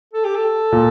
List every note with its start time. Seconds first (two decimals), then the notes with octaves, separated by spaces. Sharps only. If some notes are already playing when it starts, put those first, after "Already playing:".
0.13 A4
0.24 G4
0.35 A4
0.72 A#2